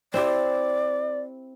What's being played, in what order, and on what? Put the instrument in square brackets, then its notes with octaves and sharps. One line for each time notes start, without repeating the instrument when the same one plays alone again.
[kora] C4 E4 G4 [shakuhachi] D5